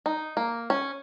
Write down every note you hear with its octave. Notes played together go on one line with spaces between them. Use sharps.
D#4
A#3
C#4